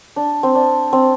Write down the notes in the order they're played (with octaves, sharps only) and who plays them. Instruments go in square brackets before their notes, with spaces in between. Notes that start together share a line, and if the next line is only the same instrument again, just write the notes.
[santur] D4
C4
D4
C4